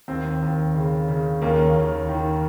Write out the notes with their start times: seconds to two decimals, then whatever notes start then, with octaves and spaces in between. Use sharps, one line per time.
0.08 D#2 C4
0.42 D#2
0.75 C#3
1.08 C#3
1.42 D#2 A#3 C#4
1.76 D#2
2.09 D#3